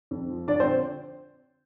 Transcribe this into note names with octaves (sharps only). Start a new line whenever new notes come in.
F2
F3
D3 D4 D5
C4 C5